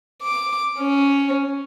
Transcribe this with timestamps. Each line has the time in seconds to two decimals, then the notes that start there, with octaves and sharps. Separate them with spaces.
0.22 D6
0.79 C#4